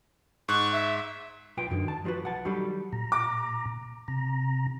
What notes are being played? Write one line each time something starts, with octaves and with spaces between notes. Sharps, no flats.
G#2 C#6 F#6
E5
B1 F4 B4 G5
F#2 D3 D#3
A5
F3 G3 F4 F#4 B4
B1 F#5 A5
D#3 F#3 G3 G4 A4 B5
A#2 A#5
D6
C3 A#5